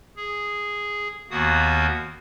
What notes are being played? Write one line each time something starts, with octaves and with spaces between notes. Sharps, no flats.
G#4
D#2 D#3 A#3 B3 F#4 D#6